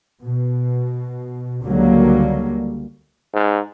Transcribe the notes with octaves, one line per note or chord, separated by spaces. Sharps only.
B2
C#2 D3 F#3 G3 A#3
G#2